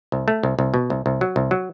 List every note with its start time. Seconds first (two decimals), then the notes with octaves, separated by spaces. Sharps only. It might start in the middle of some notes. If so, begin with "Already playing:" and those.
0.12 C2
0.28 A3
0.43 C2
0.59 C2
0.74 B2
0.90 C2
1.06 C2
1.21 F#3
1.36 C2
1.51 F#3